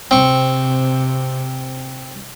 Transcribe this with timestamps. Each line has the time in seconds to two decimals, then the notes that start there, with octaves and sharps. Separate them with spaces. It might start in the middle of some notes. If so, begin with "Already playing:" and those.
0.11 C3 C4 C#6